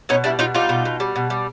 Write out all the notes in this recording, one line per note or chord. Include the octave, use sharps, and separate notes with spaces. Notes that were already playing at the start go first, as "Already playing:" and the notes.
B2 C#4 D#4
G3 D4 E4
B2 D#4 F4
G3 D#4 F4
B2
B2
G3
B2
G3